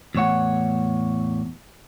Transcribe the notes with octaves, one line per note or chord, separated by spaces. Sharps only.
E2 A2 C#5 F#5